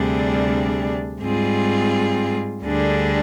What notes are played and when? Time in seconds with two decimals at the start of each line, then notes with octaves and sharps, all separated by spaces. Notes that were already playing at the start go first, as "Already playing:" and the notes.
Already playing: D2 C3 G3 D4 G#4
1.20 G#2 G3 C4 F4 G#4
2.63 D2 D3 G3 D4 G#4